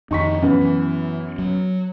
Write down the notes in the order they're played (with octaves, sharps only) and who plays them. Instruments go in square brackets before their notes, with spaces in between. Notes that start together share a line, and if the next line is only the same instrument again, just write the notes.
[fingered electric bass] F2 D#3 [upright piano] D#4 C#6 B6
[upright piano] F#2 B3 [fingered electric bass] E3
[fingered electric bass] E3
F#3